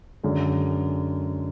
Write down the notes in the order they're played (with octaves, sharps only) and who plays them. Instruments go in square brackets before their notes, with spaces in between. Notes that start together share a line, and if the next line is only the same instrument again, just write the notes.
[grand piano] F#2 D3 G#3